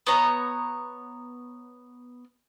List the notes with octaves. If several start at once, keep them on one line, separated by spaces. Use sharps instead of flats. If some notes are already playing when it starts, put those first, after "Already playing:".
B3 C#5 A#5